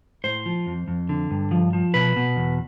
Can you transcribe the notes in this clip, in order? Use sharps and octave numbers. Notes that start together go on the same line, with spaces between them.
A2 C5
F3
F2
F2
D3
G2
F3
F3
B2 B4
B2
E2